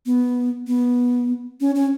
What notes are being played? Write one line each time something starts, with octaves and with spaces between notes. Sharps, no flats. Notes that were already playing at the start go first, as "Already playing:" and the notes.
B3
B3
C#4
C#4